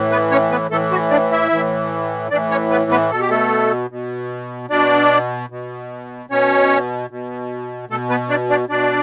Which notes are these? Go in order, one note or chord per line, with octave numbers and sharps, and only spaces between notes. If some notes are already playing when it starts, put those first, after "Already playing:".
Already playing: A2 E3
B3 B4
C#4 C#5
B3 B4
A2 E3 A3 A4
F#4
D4 D5
E4 E5
A2 E3
A2 E3 D4 D5
C#4 C#5
B3 B4
B3 B4
B2 A4
G4
A3 A4
B2
B2 D4 D5
B2
B2 C#4 C#5
B2
B2 A3 A4
B3 B4
D4 D5
D4 D5
B2 D4 D5